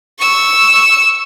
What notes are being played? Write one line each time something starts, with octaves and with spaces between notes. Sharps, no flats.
C#6 E6